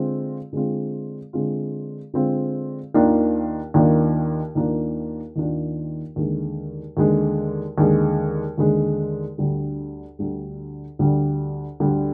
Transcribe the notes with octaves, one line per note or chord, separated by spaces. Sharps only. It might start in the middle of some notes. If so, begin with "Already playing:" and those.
Already playing: D3 G#3 C4 F4
D3 G#3 C4 F4
D3 G#3 C4 F4
D3 G#3 C4 F4
D#2 D#3 A#3 D4 F4
D#2 D#3 A#3 D4 F4
D#2 D#3 A#3 D4 F4
D#2 D#3 A#3 D4 F4
D#2 D3 G#3
D#2 D3 G#3
D#2 D3 G#3
D#2 D3 G#3
D2 D3 G3
D2 D3 G3
D2 D3 G3
D2 D3 G3